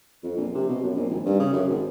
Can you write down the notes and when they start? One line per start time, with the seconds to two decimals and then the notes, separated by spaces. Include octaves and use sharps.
0.23 F2
0.37 A#1
0.55 C3
0.69 B2
0.83 F#2
0.96 A#1
1.09 G#1
1.25 G2
1.40 C#3
1.53 F#2
1.69 G#1